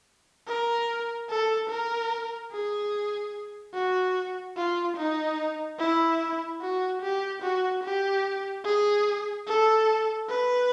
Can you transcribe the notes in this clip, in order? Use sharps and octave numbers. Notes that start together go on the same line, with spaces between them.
A#4
A4
A#4
G#4
F#4
F4
D#4
E4
F#4
G4
F#4
G4
G#4
A4
B4